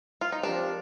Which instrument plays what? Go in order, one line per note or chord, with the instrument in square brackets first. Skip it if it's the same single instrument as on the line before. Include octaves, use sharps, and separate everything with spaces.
[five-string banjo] F4
D#4
[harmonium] F3 C4 G4 A#4 [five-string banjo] D4